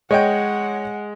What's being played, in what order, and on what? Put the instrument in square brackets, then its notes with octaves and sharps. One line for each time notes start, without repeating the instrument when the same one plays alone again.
[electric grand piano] G#3 [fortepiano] C#5 D#5 G5 [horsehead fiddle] F#5